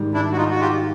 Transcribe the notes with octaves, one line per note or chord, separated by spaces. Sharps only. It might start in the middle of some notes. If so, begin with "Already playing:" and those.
Already playing: G#2 D#3 G3
D4 E4
F#4
D#4 F4
F#4
F4 G4